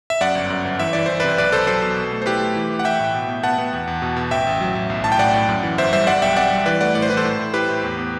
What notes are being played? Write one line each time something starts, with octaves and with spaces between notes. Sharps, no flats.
E5
F#2 D5 F#5
G1
F#2
G1
E3 E5
E3 D5
E3 C5
C3 B4 D5
B1 B4 D5
B1 A4 C5
F#3 A4 C5
B2
B2
A3
C5
E4 G4 B4
A3
E3
E3
F#5
E3 E5 G5
A2
B2
B3
B3 F#5 A5
B3
E2
E2
B2
B2
A1 E5 G5
A1
F#3
A1
B1
A2 A5
G5
A2 D5 F#5
A2
F#2
E3
G1 C5 E5
G3 C5 E5
G3 D5 F#5
B1 E5 G5
C4 D5 F#5
G3
E3 B4 D5
A3 D5 F#5
A2 D5
C5
E3 B4
A4 C5
A2
A2
E4 G4 B4
A2
E2
B3